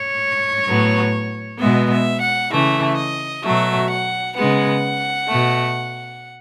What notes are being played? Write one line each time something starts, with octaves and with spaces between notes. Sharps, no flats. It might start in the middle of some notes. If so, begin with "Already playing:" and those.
Already playing: C#5
A2 F#3 B3
B2 G#3 B3 E5
E5
F#5
C#3 E3 A3 E5
D#5
B2 F#3 A3 E5
F#5
C#3 G#3 B3 F#5
B2 A3